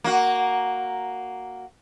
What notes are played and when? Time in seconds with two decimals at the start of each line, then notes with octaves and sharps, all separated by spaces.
0.04 A#3 F#4